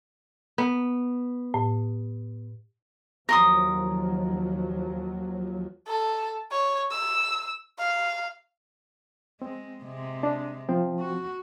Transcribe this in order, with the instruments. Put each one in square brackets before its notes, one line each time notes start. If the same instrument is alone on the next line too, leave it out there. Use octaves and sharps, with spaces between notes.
[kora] B3
[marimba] A2
[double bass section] D#2 F3 F#3 [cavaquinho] A#4 C6 D#6
[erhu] A4
C#5
E6
F5
[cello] G#3 [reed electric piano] C4
[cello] C3 G#3
[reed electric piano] D4
[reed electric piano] F3 [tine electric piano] C4
[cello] F#4